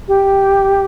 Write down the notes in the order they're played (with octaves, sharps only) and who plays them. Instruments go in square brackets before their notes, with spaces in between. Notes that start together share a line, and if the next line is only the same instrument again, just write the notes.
[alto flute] G4